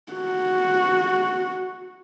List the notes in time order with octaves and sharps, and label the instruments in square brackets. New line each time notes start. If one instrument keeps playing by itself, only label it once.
[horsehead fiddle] F#4